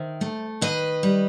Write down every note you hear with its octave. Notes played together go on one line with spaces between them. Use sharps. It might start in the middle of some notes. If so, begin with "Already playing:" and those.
Already playing: D#3 C5 E5
A3
D#3 B4 D#5
G3